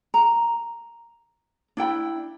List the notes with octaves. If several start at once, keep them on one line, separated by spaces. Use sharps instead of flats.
A#5
D4 E4 G5 B5